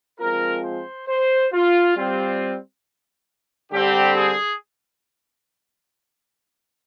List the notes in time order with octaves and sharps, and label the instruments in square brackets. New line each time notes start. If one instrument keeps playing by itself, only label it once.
[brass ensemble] F3 G#3 C4 F4 A#4
C5
C5
F4
G3 C4 F4
D3 G3 C4 G4
G#4